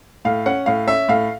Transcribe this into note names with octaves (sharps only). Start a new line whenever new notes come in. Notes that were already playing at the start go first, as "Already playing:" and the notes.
A2 F5
C#4 F#5
A2 F5
C#4 E5
A2 F5